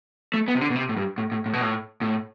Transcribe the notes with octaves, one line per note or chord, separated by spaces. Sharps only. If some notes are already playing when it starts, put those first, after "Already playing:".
A3
B3
C3
D3
B2
C3
A2
G2
A2
A2
A2
B2
A2
A2